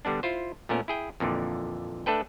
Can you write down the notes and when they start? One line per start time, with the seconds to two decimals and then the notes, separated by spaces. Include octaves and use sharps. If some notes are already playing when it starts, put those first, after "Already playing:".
0.05 D3 G3 B3 D4
0.23 E4 F4 C5
0.69 A#2 A3 B3 C#4 A#4
0.88 E4 G#4 G5
1.20 F2 A#2 D3 E3
2.06 A3 D4 A4 B4 G5